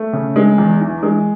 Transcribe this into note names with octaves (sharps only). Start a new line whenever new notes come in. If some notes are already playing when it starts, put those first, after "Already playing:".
Already playing: A3
C#3
G#3
E2
E3
G#3